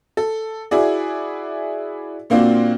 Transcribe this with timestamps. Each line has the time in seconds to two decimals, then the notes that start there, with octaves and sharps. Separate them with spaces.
0.17 A4
0.71 E4 F#4 G#4 D5
2.30 A#2 A#3 C4 D4 F4 F#4